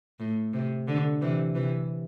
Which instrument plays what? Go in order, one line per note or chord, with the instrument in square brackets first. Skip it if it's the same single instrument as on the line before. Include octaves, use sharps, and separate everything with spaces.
[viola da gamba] A2
C3
D3
C3 E3
C3 E3